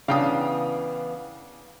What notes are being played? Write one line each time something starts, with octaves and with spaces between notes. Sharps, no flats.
C#3 E3 B3 D4 F5 G5 D#6